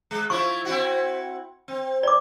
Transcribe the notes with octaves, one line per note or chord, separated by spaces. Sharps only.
G#3
F3 E4 C#6
C4 E4 F#4
C4
D5 D6